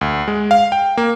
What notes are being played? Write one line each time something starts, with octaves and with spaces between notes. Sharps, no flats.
D2
G#3
F5
G5
A#3